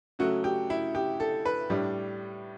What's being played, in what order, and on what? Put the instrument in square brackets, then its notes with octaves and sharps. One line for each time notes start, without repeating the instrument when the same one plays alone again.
[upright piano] C#3 F#3 A3 F#4
G4
E4
G4
A4
B4
A2 G3 D4